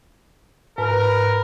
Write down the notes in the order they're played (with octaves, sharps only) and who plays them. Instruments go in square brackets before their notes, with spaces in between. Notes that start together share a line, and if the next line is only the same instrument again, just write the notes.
[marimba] G#2 [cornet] A#4 [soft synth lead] B4